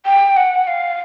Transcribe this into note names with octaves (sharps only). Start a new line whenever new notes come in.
G5
F#5
F5